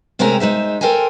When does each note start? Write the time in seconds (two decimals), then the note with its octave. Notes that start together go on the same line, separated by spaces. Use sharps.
0.19 C3 G#3 A3 C4 C#4 A#4
0.40 G#3 D#4 C5 E5
0.81 A4 A#4 C5 G5 G#5